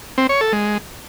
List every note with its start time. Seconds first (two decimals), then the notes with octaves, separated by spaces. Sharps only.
0.18 C4
0.29 C#5
0.41 A4
0.53 G#3